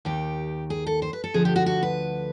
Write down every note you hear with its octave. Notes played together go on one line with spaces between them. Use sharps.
D#2 D#3 G4
G#4
A4
C5
B4
A4
D2 D3 F3 G#4
G4
F#4
F#4
B4